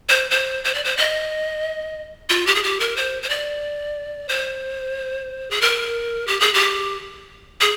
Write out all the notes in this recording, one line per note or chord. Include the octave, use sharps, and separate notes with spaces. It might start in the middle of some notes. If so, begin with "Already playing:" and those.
C5
C5
C5
D5
C5
D#5
F4
G4
G#4
G4
A#4
C5
C5
D5
C5
G#4
A#4
G4
G#4
G4
G#4